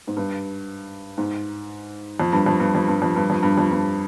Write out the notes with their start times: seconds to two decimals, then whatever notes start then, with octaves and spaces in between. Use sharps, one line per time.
0.07 G#2
0.17 G2
1.18 G#2
2.20 F2
2.33 G2
2.46 F2
2.60 G2
2.75 F2
2.88 G2
3.02 F2
3.16 G2
3.30 F2
3.43 G2
3.58 F2
3.72 G2